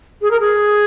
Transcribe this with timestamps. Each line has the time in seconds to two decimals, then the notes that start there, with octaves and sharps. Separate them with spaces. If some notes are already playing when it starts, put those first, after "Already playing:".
0.22 G#4
0.31 A#4
0.40 G#4